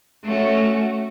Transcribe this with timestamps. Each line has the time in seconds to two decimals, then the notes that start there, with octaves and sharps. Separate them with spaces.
0.24 A3 C#4 F#4